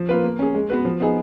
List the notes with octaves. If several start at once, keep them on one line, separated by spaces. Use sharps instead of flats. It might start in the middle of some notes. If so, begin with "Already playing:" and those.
Already playing: F3
A#3 F4 B4
A#3
C#4 G#4
G#3
B3 F#4 B4
F3
B3 D#4 G#4